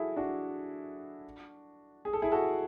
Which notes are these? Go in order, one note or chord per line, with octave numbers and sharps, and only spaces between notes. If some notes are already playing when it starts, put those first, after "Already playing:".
Already playing: E4 F#4 G#4 A4
D4 F#4
G#4
A4
E4 G#4
F#4 A4